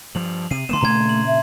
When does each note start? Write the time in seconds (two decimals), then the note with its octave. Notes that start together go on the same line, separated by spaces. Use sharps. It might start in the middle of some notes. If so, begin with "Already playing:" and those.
0.15 G2 F3 F7 F#7
0.51 C3 C7 D#7
0.69 D3 A3 B3 C6 E7
0.81 G2 A#2 C#3 A3 A#5 G#6
1.09 F#7
1.27 E5